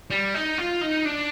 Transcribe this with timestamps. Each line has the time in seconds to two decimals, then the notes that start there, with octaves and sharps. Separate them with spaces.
0.10 G3
0.34 D#4
0.58 F4
0.81 D#4
1.05 D4